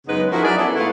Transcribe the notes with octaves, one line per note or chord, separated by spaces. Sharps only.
F#2 C#3 G#3 B3 D#4 B4
F3 D#4 E4 F#4 A#4
F#3 C#4 E4 G#4 D5
B3 E4 A4
G#2 A3 B3 E4 F5 F#5